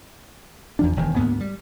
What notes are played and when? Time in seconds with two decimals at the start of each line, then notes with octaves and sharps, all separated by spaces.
0.79 E2 F3 D4
0.96 E1 G2 D#3
1.16 D2 G#2 A#3 B3
1.41 G3